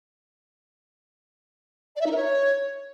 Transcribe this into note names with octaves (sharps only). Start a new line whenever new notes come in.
D5
E5
D#4
A#4
C#5